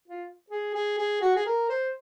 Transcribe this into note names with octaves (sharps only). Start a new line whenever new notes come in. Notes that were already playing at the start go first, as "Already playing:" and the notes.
F4
G#4
G#4
G#4
F#4
G#4
A#4
C5